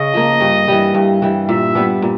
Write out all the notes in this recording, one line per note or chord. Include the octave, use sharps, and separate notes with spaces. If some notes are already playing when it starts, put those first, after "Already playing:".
Already playing: C#3 D#5
F3 A#3
G2
E3 G3
G2
E3 G3
A#2 E5
G3 B3 D4
A#2